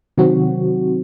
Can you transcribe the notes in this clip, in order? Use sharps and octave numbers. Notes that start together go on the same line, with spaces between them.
C3 D#3 F#3 C4 F#4